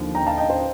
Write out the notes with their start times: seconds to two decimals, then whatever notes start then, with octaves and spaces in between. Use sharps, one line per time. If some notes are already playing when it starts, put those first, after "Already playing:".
Already playing: D#2 D3 F3
0.15 G5 A#5
0.26 F5 A5
0.37 D#5 G5
0.50 C5